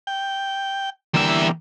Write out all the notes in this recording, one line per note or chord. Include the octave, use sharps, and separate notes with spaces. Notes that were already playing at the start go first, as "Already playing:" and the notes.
G5
E2 D3 G3 A#3 E5